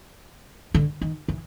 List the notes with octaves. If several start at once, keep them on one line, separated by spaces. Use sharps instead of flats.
D3
D#3
E3